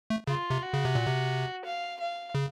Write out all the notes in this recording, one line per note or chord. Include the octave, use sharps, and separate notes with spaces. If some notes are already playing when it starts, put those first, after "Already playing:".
A3
C#3 F4
C3
F#4
C#3
C3
A#2
C3
F5
F5
C#3